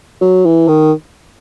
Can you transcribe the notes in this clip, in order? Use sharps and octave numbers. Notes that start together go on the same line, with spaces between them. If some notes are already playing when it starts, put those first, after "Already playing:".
F#3
E3
D#3